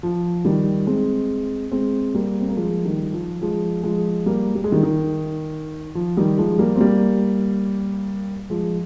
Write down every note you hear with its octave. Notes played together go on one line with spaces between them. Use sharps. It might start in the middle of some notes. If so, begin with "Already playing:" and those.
F3
D#3 G3
G#3 C4
G#3 C4
G3 A#3
C4
A#3
F3 G#3
D#3 G3
F3
F3 G#3
F3 G#3
G3 A#3
G3
G#3
D#3 G3
D#3
F3
D#3 G3
F3 G#3
G3 A#3
C4
G3 A#3
F3 G#3